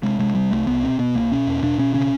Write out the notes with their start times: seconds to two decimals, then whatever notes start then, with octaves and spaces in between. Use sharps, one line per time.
0.03 C3 G#3
0.19 C3 G#3
0.35 C3 G3
0.51 C2 A3
0.67 C2 B3
0.83 B2 C4
0.99 B2 B3
1.15 C2 A#3
1.31 B2 C#4
1.47 E2
1.62 B2 D4
1.78 B2 C#4
1.94 C#3 C#4